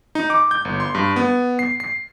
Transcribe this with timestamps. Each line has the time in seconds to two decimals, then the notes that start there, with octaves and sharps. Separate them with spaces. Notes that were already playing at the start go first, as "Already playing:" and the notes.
0.15 D#4
0.30 D6
0.51 G6
0.65 G1
0.80 C6
0.95 G2
1.16 B3
1.59 C7
1.80 C7